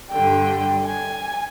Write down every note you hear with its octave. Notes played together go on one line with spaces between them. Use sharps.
G2 D3 G3 G5
G#5